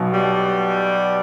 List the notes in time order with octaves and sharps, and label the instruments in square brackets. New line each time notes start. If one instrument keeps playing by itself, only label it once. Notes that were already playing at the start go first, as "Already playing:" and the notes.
Already playing: [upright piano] B1 B2 F#3
[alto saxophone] G3